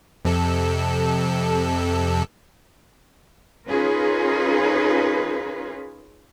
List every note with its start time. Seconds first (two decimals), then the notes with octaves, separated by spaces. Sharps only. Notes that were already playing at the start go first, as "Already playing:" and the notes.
0.25 F2 C3 A4
3.68 C#4 D#4 F4 G#4 A#4 B4